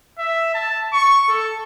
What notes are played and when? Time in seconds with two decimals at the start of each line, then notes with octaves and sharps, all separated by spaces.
0.19 E5
0.54 A5
0.93 C#6
1.29 A4